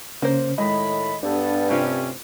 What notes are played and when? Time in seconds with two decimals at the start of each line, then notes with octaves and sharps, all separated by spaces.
0.22 C#3 A#3 C#4 C5
0.58 A2 D#3 G#3 D#5 B5
1.23 G2 B3 D4 A4
1.69 C3 A3 C4 C#4 F4